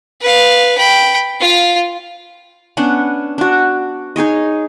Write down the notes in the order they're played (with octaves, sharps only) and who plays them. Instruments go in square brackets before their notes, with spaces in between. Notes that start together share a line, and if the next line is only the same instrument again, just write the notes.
[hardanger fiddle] B4 F5
G5 B5
F4 F5
[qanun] B3 C#4 D4 F#5
D4 F#4
D#4 G#4 C#5 D#5